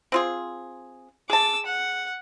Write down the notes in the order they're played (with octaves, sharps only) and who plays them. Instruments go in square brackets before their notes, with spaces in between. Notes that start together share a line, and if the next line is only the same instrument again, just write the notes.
[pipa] C4 F4 G#4
[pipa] G#4 A5 [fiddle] D6 E6
[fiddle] F#5